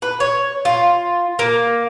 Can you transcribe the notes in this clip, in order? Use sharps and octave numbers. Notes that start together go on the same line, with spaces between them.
B4
C#5
F4
A#3